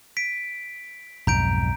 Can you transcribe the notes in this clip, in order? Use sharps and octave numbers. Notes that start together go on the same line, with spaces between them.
B6 D7
B1 F2 G#2 A#5 G6 D7